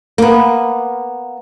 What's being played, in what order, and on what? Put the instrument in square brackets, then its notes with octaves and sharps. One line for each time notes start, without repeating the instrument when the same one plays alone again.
[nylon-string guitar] A#3 B3